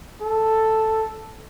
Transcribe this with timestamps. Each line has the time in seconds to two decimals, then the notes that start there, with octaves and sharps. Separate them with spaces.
0.22 A4